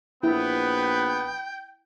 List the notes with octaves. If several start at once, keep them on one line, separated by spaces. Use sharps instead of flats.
A#1 B3 E4 B4 G5